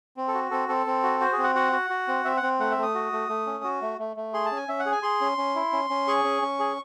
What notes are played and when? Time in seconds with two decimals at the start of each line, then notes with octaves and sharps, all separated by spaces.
0.17 C4
0.28 A4
0.34 F#4
0.51 C4 A4
0.69 C4 A4
0.86 C4
1.03 F#4
1.21 F#4 C5
1.32 G#4
1.38 C4
1.44 F#5
1.55 F#4 F#5
1.72 F#4
1.90 F#4
2.08 C4
2.25 C4 E5
2.37 F#5
2.43 C4
2.60 A3 F#5
2.71 E5
2.78 A3
2.83 D#6
2.95 F#4
3.12 A3
3.29 A3
3.47 C#4
3.64 F#4
3.82 A3
3.99 A3
4.17 A3
4.33 G#4 C6
4.45 A5
4.51 C#4
4.57 G#5
4.68 C#4 E5
4.80 F#5
4.86 G#4
4.92 G#5
5.03 G#4 C6
5.21 C#4
5.38 C#4
5.55 E4
5.73 C#4
5.90 C#4
6.08 G#4 C#6
6.25 C#4
6.42 C#4
6.59 G#4